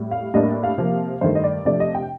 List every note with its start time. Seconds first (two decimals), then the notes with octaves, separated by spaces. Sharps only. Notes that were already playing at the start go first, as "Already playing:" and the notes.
Already playing: A2 G3
0.11 F5
0.34 A2 G3 A#3 D4 D#5
0.63 F5
0.77 C3 F3 A#3
1.21 G2 D#3 A3 C5
1.35 D#5
1.44 D5
1.65 C3 F3 A3 D4 D5
1.80 D#5
1.95 G5